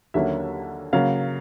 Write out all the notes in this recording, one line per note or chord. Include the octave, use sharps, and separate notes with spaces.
D#2 D3 F#3 A#3 C#4 E5
C#3 F#3 A#3 F5